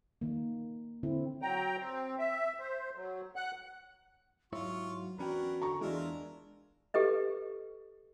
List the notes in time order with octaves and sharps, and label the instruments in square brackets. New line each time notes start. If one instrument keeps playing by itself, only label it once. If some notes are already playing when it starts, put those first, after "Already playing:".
[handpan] D#3 A#3
D3 C4 E4
[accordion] F#3 G5 A#5
C4
E5
C5
F#3
F#5 F#6
[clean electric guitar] G#2 E4 C#5 [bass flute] F#3 [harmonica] F4 C#6
[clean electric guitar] E2 C#4 G5 [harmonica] D4 A#4 B4 [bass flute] F#4
[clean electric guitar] D3 [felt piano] A#5 C#6
[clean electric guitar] E2 E3 [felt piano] G#3 D4 [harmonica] F4 A#4 E5
[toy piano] G4 A4 B4 D#5